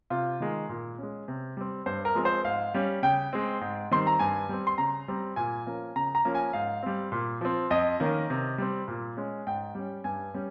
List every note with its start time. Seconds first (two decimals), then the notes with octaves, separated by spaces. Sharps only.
0.10 C3 F4
0.40 D#3 G#3
0.69 A#2
0.98 G#3 C#4
1.28 C3
1.57 G3 C4
1.86 G2 C5
2.05 A#4
2.15 F3 G#3 C4
2.25 C5
2.45 G#2 F5
2.74 G3 C#4
3.02 C#3 G5
3.33 G#3 C4
3.61 G#2
3.91 D#3 G3 C4 C6
4.07 A#5
4.19 G2 G#5
4.49 G3 C4
4.67 C6
4.78 C#3 A#5
5.08 G3 C4
5.36 A#2 G#5
5.66 F3 A#3 C#4
5.96 C#3 A#5
6.15 A#5
6.25 F3 A#3 C#4
6.35 G#5
6.53 G#2 F5
6.83 G3 C4
7.12 A#2
7.41 F3 C4
7.70 F2 D#5
8.00 D#3 A#3 C#4
8.30 C3
8.58 G3 C4
8.88 A#2
9.17 G#3 C#4
9.47 G#2 G5
9.75 G3 C#4
10.04 G2 G#5
10.34 G3 C#4